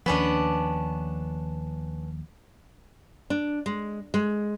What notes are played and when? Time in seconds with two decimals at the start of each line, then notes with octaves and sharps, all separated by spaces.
0.06 D#2 F3 B3 C#4 D4
3.30 D4
3.66 G#3
4.14 G#3